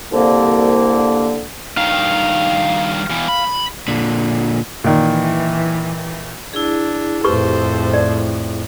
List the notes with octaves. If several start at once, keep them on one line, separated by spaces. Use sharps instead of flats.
C2 D3 A#3
G2 D#3 F5
B2 E3
B5
A#2 D3
A#2 D#3 E3
D4 E4 G#4
F2 A2 G4 A4 B4 C5 C#6
D5